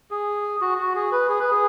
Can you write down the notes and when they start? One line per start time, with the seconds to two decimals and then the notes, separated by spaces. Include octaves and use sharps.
0.11 G#4
0.61 F#4
0.78 F#4
0.95 G#4
1.12 B4
1.29 G#4
1.40 B4
1.51 G#4